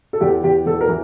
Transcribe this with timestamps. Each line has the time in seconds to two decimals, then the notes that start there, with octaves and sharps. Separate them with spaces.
0.13 A4
0.21 E2 G4
0.44 E2 G4
0.66 E2 A4
0.81 A#4
0.89 E3